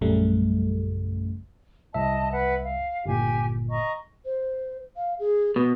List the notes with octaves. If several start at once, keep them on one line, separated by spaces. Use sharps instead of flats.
A#1 F#2 C#3 G3 A3
C2 D#5 E5 A5
B4 F#5
F5
G1 A#2 G4 G#5
D#5 A#5 C#6
C5
F5
G#4
B2 B4